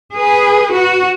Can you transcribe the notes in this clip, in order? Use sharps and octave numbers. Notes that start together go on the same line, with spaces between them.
G#4 B4
F#4